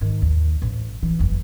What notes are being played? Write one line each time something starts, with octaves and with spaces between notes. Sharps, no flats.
G#2 D#3
D#2
A1
E3
F#1 E2